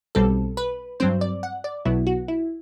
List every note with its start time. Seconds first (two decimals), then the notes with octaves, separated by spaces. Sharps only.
0.15 B1 B2 G3 C4 A4
0.57 B4
1.00 G2 F#3 C4 C5
1.21 D5
1.43 F#5
1.64 D5
1.85 B1 B2 F#3 B3 E4
2.07 F#4
2.28 E4